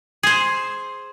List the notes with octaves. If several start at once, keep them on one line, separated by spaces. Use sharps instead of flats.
G#4 C5